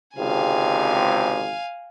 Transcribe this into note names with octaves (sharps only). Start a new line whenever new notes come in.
G#1 C#2 C3 F5 G#5